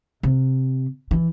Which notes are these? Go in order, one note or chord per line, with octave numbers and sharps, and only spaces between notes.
C3
E3